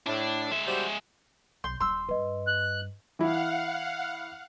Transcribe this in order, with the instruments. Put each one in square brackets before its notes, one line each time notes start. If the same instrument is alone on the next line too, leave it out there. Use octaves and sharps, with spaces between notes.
[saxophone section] A2 [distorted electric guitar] D4
[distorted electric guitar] G#3 E5
[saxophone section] G3 F#4 C5
[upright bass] B1 [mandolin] C6 [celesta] G6
[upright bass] D#1 G3 [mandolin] C6 E6
[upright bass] G2 [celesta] B4 D#5
[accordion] F#6
[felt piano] E3 E4 [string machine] F5 F#5